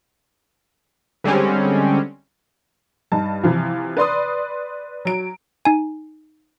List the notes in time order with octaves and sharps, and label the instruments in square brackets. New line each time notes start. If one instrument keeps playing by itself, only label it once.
[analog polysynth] D3 G3 G#3 C4 C#4
[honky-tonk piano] G2 D#4 A5
C3 E3 F3
B4 D5 C6 D#6
F#3 D7
[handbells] D#4 G#5